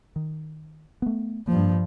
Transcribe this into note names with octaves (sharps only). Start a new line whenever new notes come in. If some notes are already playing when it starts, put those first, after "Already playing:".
D#3
A3 B3
G2 F3 A#3